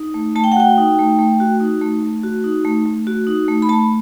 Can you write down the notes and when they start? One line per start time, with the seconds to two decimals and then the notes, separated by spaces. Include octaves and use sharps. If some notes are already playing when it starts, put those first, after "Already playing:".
Already playing: D#4
0.14 A3
0.36 A3 A5
0.44 G5
0.52 F#5
0.57 F#4 G5
0.78 D#4
0.99 A3
1.19 A3
1.40 F#4
1.60 D#4
1.81 A3
2.03 A3
2.23 F#4
2.44 D#4
2.65 A3
2.86 A3
3.07 F#4
3.27 D#4
3.48 A3
3.62 B5
3.69 A3 A5